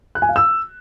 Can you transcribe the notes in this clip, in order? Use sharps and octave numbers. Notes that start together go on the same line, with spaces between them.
F#6
G#5
F5
E6